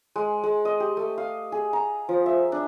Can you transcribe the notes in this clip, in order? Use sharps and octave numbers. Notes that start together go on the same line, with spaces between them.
G#3
G#3
D#5
G4
A3
F5
G#4
A#5
F3
E5
D4